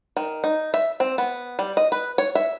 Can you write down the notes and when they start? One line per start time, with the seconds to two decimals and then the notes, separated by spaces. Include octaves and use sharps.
0.17 D#3
0.44 D#4
0.74 E5
1.00 C4
1.18 B3
1.59 G3
1.77 D#5
1.92 B4
2.18 C#5
2.35 E5